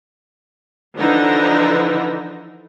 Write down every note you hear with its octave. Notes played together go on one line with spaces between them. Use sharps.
D3 E3 F3 D4 D#4